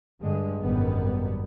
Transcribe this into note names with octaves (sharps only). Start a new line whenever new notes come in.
G2 D3 G#3
G#1 F#2 B2 D#3 G3 B3